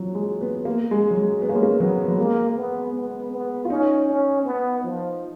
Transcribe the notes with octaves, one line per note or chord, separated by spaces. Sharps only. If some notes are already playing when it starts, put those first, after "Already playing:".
Already playing: F3 F#3
G#3
B3
A#3
G#3
F#3
G#3
B3 C#4
A#3
G#3
A#3
F#3 B3
F#3
G#3 A#3
B3
B3
B3
F4
C#4 D#4
C#4
B3
F3